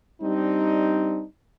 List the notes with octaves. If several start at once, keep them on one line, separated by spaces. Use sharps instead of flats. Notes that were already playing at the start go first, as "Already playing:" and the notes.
G3 C4 D4 D#4